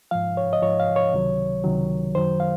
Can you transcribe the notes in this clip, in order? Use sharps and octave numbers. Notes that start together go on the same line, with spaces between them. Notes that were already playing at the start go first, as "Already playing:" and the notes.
G#2 F3 F5
C#5
D#5
G#2 F3 C#5
F5
C#5
C#2 C3 D#3 F#3
C#2 C3 D#3 F#3
F#2 D#3 F#3 C5
F5